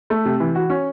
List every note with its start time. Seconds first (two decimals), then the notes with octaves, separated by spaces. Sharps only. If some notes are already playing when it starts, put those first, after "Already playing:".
0.10 A3
0.25 C3
0.40 E3
0.55 F#4
0.70 C#4